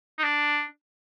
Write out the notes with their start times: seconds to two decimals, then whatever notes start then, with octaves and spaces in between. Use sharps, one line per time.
0.18 D#4
0.23 D4